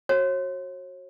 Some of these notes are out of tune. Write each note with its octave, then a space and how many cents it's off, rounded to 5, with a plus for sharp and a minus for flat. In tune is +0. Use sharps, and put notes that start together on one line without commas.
F#4 +0 C#5 -40 F#5 +0